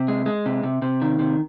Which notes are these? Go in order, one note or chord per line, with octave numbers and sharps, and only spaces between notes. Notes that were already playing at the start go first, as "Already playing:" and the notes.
Already playing: C3
G#3
G#3
C3
C3
C3
D#3
C3